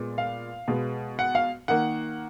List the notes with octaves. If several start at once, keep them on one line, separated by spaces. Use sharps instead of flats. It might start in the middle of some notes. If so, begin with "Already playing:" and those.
Already playing: A#2 G#3 B3
F5
B2 G#3 B3
F#5
F5
D#3 A#3 F#5